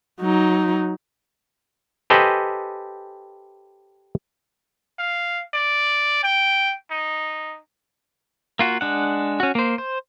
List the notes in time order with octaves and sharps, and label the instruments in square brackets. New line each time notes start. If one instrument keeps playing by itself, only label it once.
[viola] F#3 D#4
[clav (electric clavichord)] G4 A4 B4 C5 D#5 G#5
[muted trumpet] F5
D5
G5
D#4
[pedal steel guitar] A#3 F4 F#4
G#3 D4 F#5
C#4 F#4
A#3 C5
C5